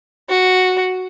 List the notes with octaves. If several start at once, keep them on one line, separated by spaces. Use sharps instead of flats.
F#4